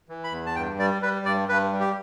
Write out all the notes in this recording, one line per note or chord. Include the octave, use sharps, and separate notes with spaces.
E3
B5
E2
A5
G2 G5
G3 D5
G3 B4
G2 D5
G2 B4
G3
G4